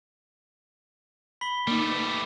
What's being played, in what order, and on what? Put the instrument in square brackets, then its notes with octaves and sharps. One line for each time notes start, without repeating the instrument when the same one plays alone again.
[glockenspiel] B5 B6 G7
[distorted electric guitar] G3 A3 [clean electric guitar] A#3 D#4
[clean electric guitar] B4